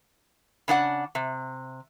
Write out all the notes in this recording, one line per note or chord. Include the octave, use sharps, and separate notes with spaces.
C#3 D4 C#5 F#5
C3